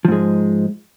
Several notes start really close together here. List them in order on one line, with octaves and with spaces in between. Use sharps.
F3 G#2 G#3